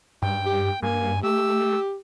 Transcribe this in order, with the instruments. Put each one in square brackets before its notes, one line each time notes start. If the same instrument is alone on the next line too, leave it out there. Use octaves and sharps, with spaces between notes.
[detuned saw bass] G2 [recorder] G5
[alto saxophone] G4
[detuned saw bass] G2 [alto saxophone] A#3 [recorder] G#5
[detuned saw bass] A3 [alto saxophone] G4 [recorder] E6